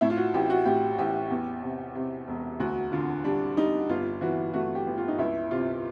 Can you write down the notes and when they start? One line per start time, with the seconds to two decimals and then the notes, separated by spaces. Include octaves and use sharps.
0.01 A2 E4
0.10 F4
0.17 F#4
0.34 A1 G4
0.50 F#4
0.65 A2 G4
0.98 A1 G4
1.31 E2
1.63 C3
1.95 C3
2.28 E1
2.60 D2 F#4
2.92 D3 F4
3.24 G3 D4
3.57 G3 D#4
3.89 G1 F4
4.21 E3 F#4
4.53 A3 F#4
4.75 G4
4.87 G1
4.98 F4
5.08 D#4
5.18 C#2 E4
5.51 C3 F4